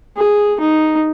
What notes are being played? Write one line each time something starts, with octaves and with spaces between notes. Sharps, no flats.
G#4
D#4